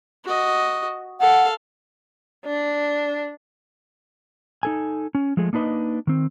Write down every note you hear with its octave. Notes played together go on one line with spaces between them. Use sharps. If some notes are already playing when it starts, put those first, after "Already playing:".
F#4 D#5
A4 F5 F#5
D4
D#4 A4 G#5
C#4
F3 G#3 A3 G#4
A#3 D4 D#4 B4 D#5
D#3 C4